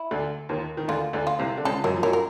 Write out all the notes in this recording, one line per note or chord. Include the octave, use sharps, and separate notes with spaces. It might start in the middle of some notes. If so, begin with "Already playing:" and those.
Already playing: E4
D2 D3
D#2 D#3
D#3
D2 D3 F4
D2 D3
F4
C2 C3
D3
C#2 C#3 A4
F#2 F#3 A#4
F3
F#2 F#3 A#4
A#4